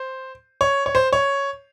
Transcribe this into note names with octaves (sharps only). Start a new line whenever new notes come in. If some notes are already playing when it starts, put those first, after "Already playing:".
Already playing: C5
C#5
C#5
C5
C#5